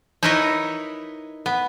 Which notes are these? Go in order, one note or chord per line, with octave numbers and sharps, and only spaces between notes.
D#4 E4 A#4 B4 C#5 D#5
B3